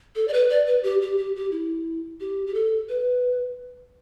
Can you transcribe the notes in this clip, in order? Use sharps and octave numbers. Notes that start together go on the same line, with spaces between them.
A4
D5
B4
D5
B4
G4
G4
G4
G4
E4
G4
G4
A4
B4